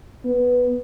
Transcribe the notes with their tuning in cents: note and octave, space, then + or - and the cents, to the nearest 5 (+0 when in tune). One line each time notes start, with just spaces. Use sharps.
B3 +0